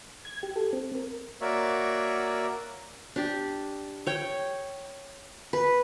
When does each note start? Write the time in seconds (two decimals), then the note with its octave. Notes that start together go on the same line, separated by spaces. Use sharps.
0.25 G#6
0.43 G4
0.56 A4
0.73 C4
0.95 A#4
1.41 A#3 F#4 A#4 C#5 D5 E5
3.16 D4 G4
4.06 C#5 G5
5.53 B4